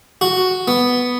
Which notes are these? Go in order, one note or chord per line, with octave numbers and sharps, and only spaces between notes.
F#4
B3